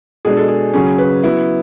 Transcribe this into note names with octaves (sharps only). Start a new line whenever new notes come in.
B2 G#3 D4 G#4
A4
G#4
C#3 F#3 C#4 G#4
B4
F#3 B3 E4